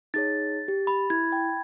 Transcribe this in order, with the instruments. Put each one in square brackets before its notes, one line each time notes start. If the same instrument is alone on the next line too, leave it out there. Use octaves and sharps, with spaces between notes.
[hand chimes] D#4 G#4 C#5 [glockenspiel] A6
[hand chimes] G4
[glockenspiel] B5
[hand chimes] E4 [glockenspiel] G#6
[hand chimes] G5